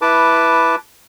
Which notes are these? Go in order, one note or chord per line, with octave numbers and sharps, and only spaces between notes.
E4 B4 A5 D6